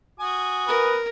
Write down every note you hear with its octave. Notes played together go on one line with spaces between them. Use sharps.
F#4 G#5 D#6
A#4 B4